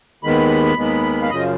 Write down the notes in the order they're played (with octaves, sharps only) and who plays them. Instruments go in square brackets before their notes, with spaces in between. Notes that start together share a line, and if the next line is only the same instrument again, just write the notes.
[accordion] D#2 D#3 G#3 B3 B5
D#2 D#3 G#3 B3
F5
F#2 C#3 F3 D#5